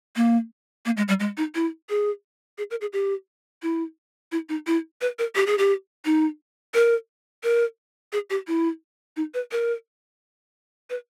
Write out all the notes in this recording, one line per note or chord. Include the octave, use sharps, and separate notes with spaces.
A#3
A#3
G#3
G3
G#3
D#4
E4
G#4
G#4
A#4
G#4
G4
E4
E4
D#4
E4
B4
A#4
G4
G#4
G4
D#4
A#4
A#4
G#4
G4
E4
D#4
B4
A#4
B4